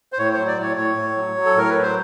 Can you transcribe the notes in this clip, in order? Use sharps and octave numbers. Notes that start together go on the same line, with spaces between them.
C5
A2 C#5
F#3 C5
D5
A2 C#5
A2 C#5
A2
F#3
F#3
A4
A2 A#4
B4
F#3
C5